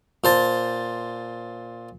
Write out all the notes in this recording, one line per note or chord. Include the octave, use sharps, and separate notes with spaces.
A#2 C5 A5